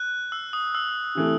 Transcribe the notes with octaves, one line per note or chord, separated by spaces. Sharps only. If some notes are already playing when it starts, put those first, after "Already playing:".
Already playing: F#6
E6
D#6
E6
C3 E3 A3